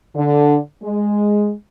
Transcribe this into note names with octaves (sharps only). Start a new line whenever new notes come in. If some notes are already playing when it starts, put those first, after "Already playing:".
D3
G#3